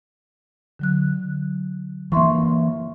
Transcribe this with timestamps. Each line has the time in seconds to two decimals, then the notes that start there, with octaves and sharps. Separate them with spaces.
0.79 D3 F#3 F#6
2.12 E3 A#3 E5 C6 C#6